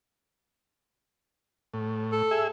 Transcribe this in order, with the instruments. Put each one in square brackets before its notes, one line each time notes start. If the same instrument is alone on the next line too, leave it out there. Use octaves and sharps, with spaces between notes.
[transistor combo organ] A2
[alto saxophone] A4
[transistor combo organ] G#4 E5